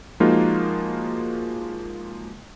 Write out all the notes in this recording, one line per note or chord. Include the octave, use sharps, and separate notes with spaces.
F3 G#3 A#3 D#4 F4 F#4